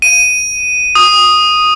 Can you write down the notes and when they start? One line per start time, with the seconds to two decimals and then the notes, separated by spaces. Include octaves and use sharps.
0.02 D#7
0.95 D#6